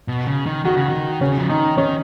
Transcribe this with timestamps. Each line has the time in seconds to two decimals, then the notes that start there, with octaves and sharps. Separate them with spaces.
0.08 B2
0.27 C#3
0.46 D#3
0.65 D#3 F#4
0.77 C#3
0.89 D#3
1.21 C#3 C#4
1.38 F3
1.49 D#3 D#4
1.78 D#3 C#4